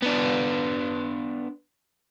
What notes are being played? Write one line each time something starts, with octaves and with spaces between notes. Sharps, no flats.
B3 D4